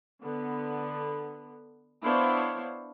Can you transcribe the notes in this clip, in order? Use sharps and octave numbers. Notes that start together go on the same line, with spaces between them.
D3 B3
B3 D4 E4 C5 C#5 F5